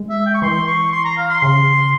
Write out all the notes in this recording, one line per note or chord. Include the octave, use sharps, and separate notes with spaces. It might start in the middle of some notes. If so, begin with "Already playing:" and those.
Already playing: G#3
E5
G5
C#6
E3 C6
C#6
C6
A#5
F5
C6
C#3